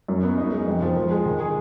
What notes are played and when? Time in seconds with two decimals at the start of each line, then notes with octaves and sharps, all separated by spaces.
0.08 F#2
0.23 B3
0.38 D#4
0.52 G#3
0.67 F2
0.81 F3
0.96 F3
1.11 G#3
1.26 D#3
1.40 G#4